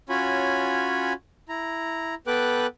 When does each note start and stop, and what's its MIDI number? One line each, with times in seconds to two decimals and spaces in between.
0.09 1.13 61
0.09 1.13 65
0.09 1.13 66
0.09 1.13 73
0.09 1.13 80
0.09 1.13 83
1.49 2.15 64
1.49 2.15 82
2.27 2.67 59
2.27 2.67 69
2.27 2.67 71
2.27 2.67 79
2.27 2.67 86
2.27 2.67 90